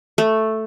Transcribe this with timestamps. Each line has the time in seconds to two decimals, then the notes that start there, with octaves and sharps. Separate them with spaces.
0.18 A3